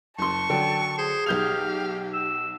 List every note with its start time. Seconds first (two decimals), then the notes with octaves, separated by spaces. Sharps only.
0.18 F#1 A5 C6 C#6
0.50 D3 F#3 G5
0.98 G#4 C5
1.26 B1 G4 F5 G6 F7
2.13 E6